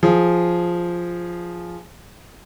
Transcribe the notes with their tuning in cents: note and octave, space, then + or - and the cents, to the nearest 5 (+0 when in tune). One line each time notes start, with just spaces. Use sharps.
F3 +0 G#4 +0